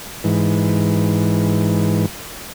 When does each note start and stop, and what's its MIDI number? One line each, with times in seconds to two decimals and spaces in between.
0.24 2.06 44
0.24 2.06 52